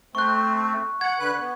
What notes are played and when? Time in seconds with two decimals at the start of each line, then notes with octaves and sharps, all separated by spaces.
0.15 A3 C4 C#6 F#6
1.01 F#5 G#6
1.19 D3 B4 F#6
1.38 B3